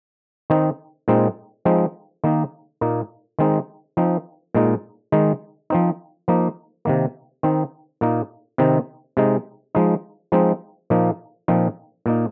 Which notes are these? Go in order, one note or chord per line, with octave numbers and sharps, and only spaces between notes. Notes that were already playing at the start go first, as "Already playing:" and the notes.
D#3 C4 D#4
A#2 G#3 C4 D#4
F3 G#3 C4 D#4
D#3 A#3 D#4
A#2 A#3 D#4
D#3 G#3 C4 D#4
F3 C4 D#4
A#2 G#3 D#4
D#3 G#3 D#4
F3 C4 D#4
F3 A#3 D#4
C3 D#3 A#3
D#3 C4 D#4
A#2 A#3 D#4
C3 D#3 C4 D#4
C3 G#3 D#4
F3 G#3 D#4
F3 G#3 C4 D#4
A#2 F3 A#3 D#4
A#2 F3 C4 D#4
A#2 A#3 D#4